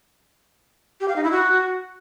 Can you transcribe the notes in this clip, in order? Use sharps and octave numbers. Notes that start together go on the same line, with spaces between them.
G4
F5
D#4
E4
F#4